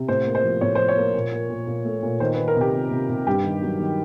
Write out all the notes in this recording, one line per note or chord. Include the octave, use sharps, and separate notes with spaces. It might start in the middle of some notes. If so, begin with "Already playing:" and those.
Already playing: C3
A2 C5
A#3
C5
F3
A2 C#5
F3 C5
C#5
A#3
A#2
A#2
A#2
A#2
A3
A#2
D#3 C5
B4
D#3
A#4
C3 G4
C3
C3
C3
G2 G4
D#3
F#3
D#3